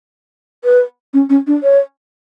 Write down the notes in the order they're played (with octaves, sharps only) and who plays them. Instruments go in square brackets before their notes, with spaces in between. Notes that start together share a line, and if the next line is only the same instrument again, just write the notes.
[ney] B4
C#4
C#4
D4
C#5